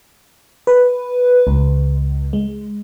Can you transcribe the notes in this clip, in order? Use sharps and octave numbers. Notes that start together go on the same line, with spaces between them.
B4
C#2
G#3